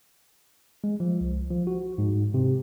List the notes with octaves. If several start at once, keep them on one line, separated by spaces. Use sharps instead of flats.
G#3
F3
C2
F3
F#4
G#2
C3